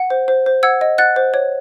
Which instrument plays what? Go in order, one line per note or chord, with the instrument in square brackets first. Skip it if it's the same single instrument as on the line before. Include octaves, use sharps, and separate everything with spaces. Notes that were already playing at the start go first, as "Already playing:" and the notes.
Already playing: [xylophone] F#5
C5
C5
C5
F#5 E6 G#6
D#5
F#5 F#6 A6
C5
C#5